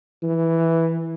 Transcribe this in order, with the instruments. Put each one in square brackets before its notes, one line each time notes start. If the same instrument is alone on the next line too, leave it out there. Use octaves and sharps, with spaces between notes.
[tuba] E3